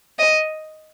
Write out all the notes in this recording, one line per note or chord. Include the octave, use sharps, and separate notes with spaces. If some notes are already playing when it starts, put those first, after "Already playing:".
D#5